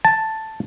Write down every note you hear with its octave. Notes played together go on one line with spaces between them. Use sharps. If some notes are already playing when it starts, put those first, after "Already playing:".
A5